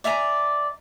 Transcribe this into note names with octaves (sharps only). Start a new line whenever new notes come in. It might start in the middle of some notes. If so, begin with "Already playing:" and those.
D5 E5 G#5 A#5